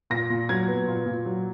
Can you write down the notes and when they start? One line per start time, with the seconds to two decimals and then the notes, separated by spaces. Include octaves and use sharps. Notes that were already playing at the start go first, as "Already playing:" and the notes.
0.10 A#2 A#6
0.30 A#2
0.49 F#3 G#6
0.68 B3
0.88 A#2
1.06 A#2
1.26 F#3